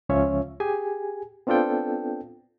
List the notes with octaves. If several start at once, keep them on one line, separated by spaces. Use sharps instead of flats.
C#2 F3 C#4 F4 C#5 E5
G4 G#4 G#5
B3 C4 D4 F4 A4 G5